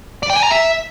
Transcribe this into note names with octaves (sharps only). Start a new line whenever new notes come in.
D5
G5
G#5
A#5
E5